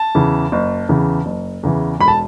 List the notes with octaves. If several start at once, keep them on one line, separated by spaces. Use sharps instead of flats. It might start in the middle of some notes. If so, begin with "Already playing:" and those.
Already playing: A5
E2 C#3 E3
F#1
E2 C#3 E3
F#1
E2 C#3 E3
E1 B5
A5